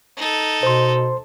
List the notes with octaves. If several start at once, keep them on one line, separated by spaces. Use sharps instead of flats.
D#4 A4
B2 C5 C6